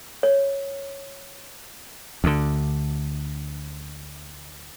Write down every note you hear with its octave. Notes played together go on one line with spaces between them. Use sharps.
C#5
D2 D3